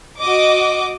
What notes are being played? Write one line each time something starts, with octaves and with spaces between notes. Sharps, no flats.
F#4 D#5 D6